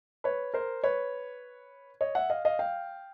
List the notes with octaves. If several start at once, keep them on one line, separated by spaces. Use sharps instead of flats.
B4 C#5
A#4 C5
B4 C#5
C#5 D#5
E5 F#5
D#5 F5
D#5 F5
F5 G5